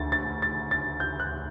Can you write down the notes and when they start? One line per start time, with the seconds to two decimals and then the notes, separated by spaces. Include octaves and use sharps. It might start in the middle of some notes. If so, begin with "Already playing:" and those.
Already playing: D2 A6
0.12 A6
0.42 A6
0.71 A6
1.00 G6
1.20 F#6